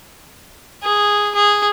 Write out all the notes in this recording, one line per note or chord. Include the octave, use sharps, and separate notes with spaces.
G#4
G#4